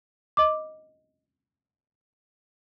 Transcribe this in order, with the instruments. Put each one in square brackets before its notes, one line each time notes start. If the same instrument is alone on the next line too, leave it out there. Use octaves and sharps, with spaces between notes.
[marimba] D#5 D6